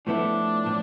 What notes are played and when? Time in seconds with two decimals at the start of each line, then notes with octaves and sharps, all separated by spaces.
0.07 A2 F3 B3 D4 E4 A4
0.66 A2 F3